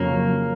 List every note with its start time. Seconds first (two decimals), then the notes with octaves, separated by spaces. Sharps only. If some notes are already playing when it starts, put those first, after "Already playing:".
Already playing: F2 C#3 F#3 A#3 C#4